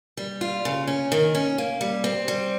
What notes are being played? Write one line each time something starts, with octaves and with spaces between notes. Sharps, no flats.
G3
F4
C#3
C#4
D#3
C#4
A#3
G3
C4
G3